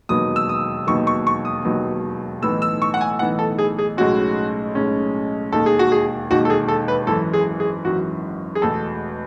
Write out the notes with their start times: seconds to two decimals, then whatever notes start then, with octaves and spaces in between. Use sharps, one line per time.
0.09 E1 D#2 D#3 F#3 B3 D#6
0.36 E6
0.49 D#6
0.87 E1 D#2 D#3 F#3 B3 C#6
1.07 C#6
1.27 C#6
1.45 D#6
1.65 E1 D#2 D#3 F#3 B3
2.42 B1 A2 E3 B3 D#4 E6
2.62 E6
2.82 C#6
2.94 F#5
3.01 G#5
3.19 B1 A2 E3 B3 D#4 F#5
3.39 A4
3.58 G#4
3.78 G#4
3.97 B1 A2 G#3 C#4 F#4
4.75 B1 A2 G#3 C#4
5.52 E1 D#2 D#3 A4
5.66 G#4
5.79 F#4
5.92 G#4
6.30 E1 D#2 D#3 F#4
6.45 A4
6.50 G#4
6.68 A4
6.88 B4
7.07 G#1 F#2 E3 A4
7.33 G#4
7.60 G#4
7.85 G#1 F#2 E3 F#4
8.55 G#4
8.62 E1 E2 B2 A3 A4